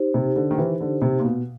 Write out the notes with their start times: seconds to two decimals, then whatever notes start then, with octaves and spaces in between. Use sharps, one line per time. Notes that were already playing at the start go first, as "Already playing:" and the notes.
Already playing: D#4 G4 C5
0.14 C3
0.36 D3
0.51 D#3
0.58 E3
0.81 D3
1.02 C3
1.20 A#2
1.25 B2